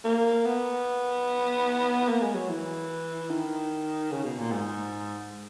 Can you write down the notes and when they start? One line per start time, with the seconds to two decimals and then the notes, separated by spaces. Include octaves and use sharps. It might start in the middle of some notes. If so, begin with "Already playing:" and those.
0.04 A#3
0.45 B3
2.07 A#3
2.22 G#3
2.35 F#3
2.49 E3
3.30 D#3
4.11 C#3
4.24 B2
4.38 A#2
4.52 G#2